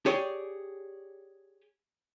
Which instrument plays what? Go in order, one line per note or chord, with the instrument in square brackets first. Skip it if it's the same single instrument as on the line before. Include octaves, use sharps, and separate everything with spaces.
[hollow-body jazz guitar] G4 G#4 C#5 D5